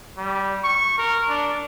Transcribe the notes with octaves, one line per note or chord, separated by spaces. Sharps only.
G3
C#6
A#4
D4